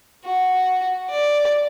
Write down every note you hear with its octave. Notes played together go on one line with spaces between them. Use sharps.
F#4
D5